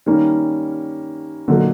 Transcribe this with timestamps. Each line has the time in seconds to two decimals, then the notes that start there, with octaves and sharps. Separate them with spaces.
0.06 D#3 G3 A#3 C#4
1.48 A#2 D3 F#3 A#3 D#4